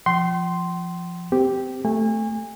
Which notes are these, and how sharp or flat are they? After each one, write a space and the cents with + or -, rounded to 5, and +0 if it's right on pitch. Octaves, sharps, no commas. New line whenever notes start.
F3 +0 G5 -40 C6 +0
C4 -20 G4 +0
A3 +0 G#5 -35